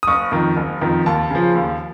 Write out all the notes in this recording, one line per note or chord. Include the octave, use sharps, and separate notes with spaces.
D#6
F#1 C#6
F2 D#3
F#1
F2 D#3
D#2 A5
C#3 F3
D#2